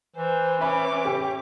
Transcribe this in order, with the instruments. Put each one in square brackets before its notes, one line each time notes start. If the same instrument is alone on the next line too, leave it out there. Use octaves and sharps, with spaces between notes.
[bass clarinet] E3 [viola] C5
[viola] C#4 D6 [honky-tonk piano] E5 G#5 B5
[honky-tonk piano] G4